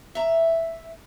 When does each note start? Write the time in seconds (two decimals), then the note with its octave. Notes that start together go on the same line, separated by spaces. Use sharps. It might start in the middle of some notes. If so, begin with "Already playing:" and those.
0.15 E5 A#5